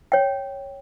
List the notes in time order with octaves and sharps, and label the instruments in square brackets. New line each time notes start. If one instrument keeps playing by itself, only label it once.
[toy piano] C#5 G5